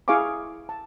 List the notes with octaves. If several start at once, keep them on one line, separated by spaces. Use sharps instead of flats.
E4 G#4 F5 G#5 C#6 D6
A5